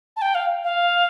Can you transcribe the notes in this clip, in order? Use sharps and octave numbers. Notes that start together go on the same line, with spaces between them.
A5
G5
F5
F5